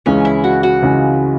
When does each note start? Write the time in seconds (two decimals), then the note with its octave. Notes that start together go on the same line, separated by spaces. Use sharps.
0.06 C#2 C#3 E3 G#3 C#4
0.25 E4
0.44 F#4
0.63 F#4
0.82 C#2 C#3 E3 G#3